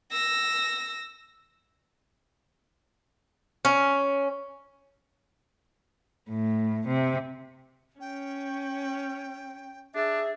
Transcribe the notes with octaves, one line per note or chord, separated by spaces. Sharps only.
E6 A#6
C#4
A2
C3
C#4 G5
D4 G#4 E5